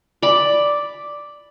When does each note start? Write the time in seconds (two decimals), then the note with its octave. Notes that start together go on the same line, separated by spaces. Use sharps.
0.22 D5 B5